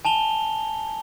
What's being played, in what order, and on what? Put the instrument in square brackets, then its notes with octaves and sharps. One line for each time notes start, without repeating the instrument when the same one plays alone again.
[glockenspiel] G#5 A5 F7 G7